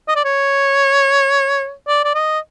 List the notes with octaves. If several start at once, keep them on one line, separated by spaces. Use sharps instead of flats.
D#5
D5
C#5
D5
D5
D#5